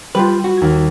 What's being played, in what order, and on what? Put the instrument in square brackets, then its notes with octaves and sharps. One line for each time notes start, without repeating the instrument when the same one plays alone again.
[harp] G3 [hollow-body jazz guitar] F4 G4 B4
[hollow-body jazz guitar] F#4
[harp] D#2 G#6